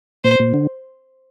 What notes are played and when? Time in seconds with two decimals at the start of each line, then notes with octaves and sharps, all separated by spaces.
0.24 A#2 C5
0.39 A#2
0.54 D3